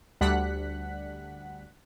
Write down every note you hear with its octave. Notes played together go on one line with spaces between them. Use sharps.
D2 G3 D4 F#5 F#6 B6